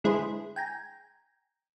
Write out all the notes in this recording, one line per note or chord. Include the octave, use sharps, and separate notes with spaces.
D3 G#3 E4 G#4 B4 C5
G5 G#5 A#5